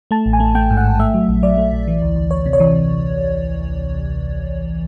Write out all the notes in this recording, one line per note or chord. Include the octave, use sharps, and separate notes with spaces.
A3 A5
A1
G#5
A3
A3 G5
G#2
F#5
A1
A3 E5
F#3
A#1
F#3 D5
A3
A#1
E3
D2
D2
D2 C#5
C3
C#5
E3